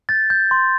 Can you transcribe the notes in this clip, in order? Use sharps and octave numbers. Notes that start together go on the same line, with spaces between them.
G6 A6
G6
C6